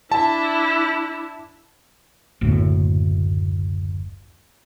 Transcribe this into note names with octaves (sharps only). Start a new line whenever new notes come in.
D4 E4 A5
F#1 D2 A2